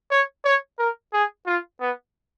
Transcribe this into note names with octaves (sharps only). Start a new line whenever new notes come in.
C#5
C#5
A#4
G#4
F4
B3